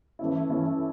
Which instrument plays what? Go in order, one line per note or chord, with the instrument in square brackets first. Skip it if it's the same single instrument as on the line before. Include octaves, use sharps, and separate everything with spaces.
[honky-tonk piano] E3 A3 C#4 E4
E3 A3 C#4 E4